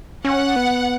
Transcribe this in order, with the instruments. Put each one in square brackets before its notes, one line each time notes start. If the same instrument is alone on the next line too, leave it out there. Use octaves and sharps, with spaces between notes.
[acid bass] C#4 [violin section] F#5
[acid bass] B3